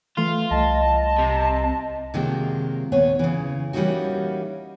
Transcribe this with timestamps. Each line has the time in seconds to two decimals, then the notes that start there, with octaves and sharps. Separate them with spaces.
0.17 E3 A3 F4
0.51 C2 D#5 A5
1.18 C3
2.14 C3 D#3 F#3 G#3 A#3 F4
2.92 D#2 A#2 B3 G#4 C#5
3.19 C#3 E3
3.73 E3 G3 A#3 C#4 D#4 F#4